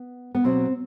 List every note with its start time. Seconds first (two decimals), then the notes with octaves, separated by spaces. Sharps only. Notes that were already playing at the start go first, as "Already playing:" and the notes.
Already playing: B3
0.35 B3
0.44 B2 F#3 C4